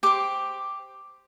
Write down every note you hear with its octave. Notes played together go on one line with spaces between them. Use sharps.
G4 C5 D6